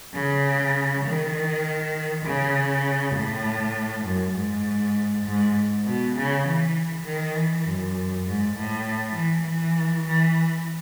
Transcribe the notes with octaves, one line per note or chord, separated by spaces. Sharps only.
C#3
D#3
C#3
A2
F#2
G#2
G#2
B2
C#3
E3
D#3
E3
F#2
G#2
A2
E3
E3
E3